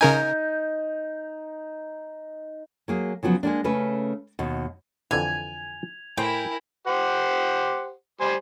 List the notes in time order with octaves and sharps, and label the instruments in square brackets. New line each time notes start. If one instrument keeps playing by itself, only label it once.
[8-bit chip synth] C#3 A#4 G#5 [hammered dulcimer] D#4
[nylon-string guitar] F#3 A#3 G#4
C#3 F3 F#3 B3
G#3 A#3 D4
C#3 A3 C#4 B4
D#2 B2
[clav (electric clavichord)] F2 D3 E3 [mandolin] G#5 [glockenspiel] G#6 F7
[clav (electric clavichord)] A2 C5 [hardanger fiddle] E4 A#4 [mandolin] G5 [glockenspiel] G#5 B5 G6
[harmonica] G4 C5 F#5
G3 C5 G#5